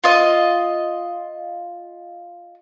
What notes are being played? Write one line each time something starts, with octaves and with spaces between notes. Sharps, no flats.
F4 D#5